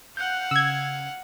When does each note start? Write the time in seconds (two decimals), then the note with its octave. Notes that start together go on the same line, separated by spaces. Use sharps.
0.17 F5 F#5 F#6 G6
0.51 C#3 E6 G#6